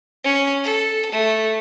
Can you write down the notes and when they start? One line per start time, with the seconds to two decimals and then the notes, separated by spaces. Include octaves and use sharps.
0.24 C#4
0.63 A4
1.11 A3